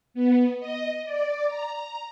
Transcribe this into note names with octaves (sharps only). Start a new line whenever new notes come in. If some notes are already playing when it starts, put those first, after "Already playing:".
B3
D#5
D5
A#5